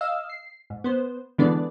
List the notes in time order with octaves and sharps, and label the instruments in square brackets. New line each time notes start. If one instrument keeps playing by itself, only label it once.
[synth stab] D#5 F5 E6
C7
G#2
B3 C5
D3 E3 G#3 B3 D4 D5